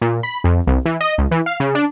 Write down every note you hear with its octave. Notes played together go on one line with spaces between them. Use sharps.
A#2
B5
F2
C2
E3
D#5
C#2
E3
F5
C#3
D4